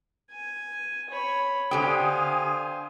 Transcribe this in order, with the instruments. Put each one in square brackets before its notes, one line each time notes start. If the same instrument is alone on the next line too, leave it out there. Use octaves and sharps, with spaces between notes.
[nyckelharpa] G#5
C#5 B5
[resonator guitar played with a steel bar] D3 G4 G5 [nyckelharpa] C5 F5 [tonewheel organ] G#5 D#6